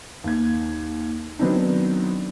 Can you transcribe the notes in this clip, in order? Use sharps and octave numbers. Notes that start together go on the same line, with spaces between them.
D#2 G#6
D#3 F#3 B3 C4 D4 D#4